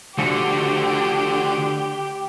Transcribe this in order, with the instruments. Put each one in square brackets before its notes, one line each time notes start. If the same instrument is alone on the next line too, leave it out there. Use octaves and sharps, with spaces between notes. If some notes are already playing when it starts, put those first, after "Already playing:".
[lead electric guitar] D3 [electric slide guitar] F3 A3 F#4 [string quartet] G4